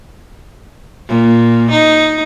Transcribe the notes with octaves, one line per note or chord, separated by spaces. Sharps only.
A#2
D#4